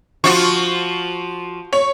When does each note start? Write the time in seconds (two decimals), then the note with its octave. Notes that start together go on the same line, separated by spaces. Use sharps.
0.24 F3 F4 F#4 C#6
1.73 C#5